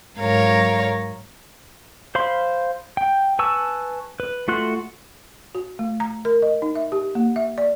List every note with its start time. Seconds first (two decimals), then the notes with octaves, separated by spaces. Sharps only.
0.18 G#2 F#3 A#4 C#5 F5 A#5
2.15 C5 F5 B5 C6
2.97 G5
3.39 B4 G#5 A5 C#6 E6
4.20 B4
4.48 A3 F4 F#4 C6 F#6
5.55 F#4
5.79 A3
6.00 A#5
6.25 A#4
6.42 D#5
6.62 D#4
6.75 E5
6.92 G4
7.15 A#3
7.36 E5
7.58 D5